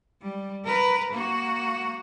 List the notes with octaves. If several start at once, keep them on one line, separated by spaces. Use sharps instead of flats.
G3
A#4 B4
A#3 F#4